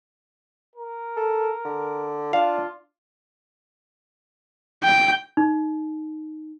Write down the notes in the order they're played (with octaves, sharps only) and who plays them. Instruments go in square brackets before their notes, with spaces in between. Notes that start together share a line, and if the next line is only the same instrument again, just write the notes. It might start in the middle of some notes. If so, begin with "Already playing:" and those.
[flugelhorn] A#4
[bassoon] A4
D3
[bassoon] D4 [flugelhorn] F4 [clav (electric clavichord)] F5
[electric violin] G5
[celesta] D#4